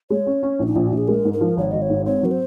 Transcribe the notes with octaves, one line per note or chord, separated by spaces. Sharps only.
G#3 C#5
C#4
C#4
A#1
D#4
A#1 F4
F#4
A#1
G#4
G#3 A#4
G#2
A#4
F3
G#1 C#5
G#1 D#5
C#5
G#2
C4 C#5
F#3 A#4
C5